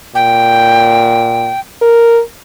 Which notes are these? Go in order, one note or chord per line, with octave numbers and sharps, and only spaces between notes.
A#2 G5
A#4